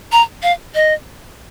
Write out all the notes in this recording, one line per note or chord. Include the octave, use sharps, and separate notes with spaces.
A#5
F5
D#5